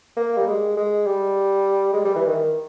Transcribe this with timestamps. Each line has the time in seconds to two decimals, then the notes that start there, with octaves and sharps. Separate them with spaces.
0.17 A#3
0.37 G3
0.47 G#3
0.77 G#3
1.06 G3
1.93 G#3
2.05 G3
2.15 E3
2.26 D#3